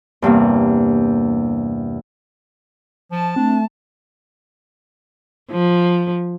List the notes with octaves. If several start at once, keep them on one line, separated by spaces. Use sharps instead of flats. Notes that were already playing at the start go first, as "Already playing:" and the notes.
E2 G2 C3 A#3
F3 A5
A3 C4 D4
F3